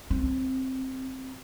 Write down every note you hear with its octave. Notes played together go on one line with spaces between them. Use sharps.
C4